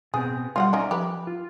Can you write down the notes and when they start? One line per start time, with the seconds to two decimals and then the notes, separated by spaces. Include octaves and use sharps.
0.14 B2 B3 C4 G#4
0.56 F#3 G3 F4 D#5 F#5
0.73 C#4 D#4 D5 E5
0.91 F3 G4 B4
1.27 F4